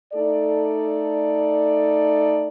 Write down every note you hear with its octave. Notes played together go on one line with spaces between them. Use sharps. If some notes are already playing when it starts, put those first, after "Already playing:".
A3 D#4 A4 D5